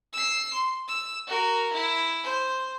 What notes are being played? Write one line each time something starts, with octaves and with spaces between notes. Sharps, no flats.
E6 C7
C6
E6
F#4 A#4
E4
C5